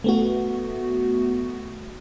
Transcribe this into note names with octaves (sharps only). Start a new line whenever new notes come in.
A3 B3 F#4